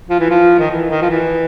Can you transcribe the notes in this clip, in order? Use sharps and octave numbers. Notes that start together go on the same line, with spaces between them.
F3
E3
F3
D#3
E3
D#3
F3
E3